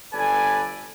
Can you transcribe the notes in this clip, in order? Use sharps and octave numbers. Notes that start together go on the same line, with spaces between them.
G1 A4 B4 D5 G#5